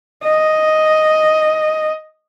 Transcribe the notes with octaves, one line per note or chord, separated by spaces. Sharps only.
D#5